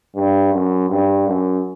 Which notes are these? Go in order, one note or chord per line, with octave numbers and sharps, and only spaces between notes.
G2
F#2
G2
F#2